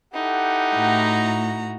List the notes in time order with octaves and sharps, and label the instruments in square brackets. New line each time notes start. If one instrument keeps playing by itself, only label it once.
[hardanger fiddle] D#4 E4 [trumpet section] G4 A4 F#5
[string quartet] A2 F#4 A#5